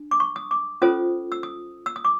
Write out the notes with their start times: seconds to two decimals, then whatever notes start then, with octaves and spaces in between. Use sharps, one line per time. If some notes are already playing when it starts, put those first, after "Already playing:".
Already playing: D4
0.11 D6
0.20 C#6
0.36 D#6
0.51 D6
0.82 C#4 F4 A4 C5 D#6
1.32 E6
1.43 D#6
1.86 E6
1.96 D#6
2.05 D6